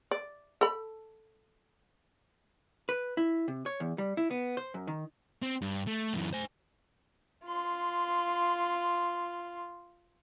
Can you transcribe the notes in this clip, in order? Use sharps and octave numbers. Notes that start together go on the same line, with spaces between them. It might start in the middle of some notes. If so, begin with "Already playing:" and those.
D5
A4 B5
B4
E4
C3
C#5
E2
G3
E4
B3
C5
F#2
D#3
C4
G2
A3
F#2 E3
C5 G#5
F4 C6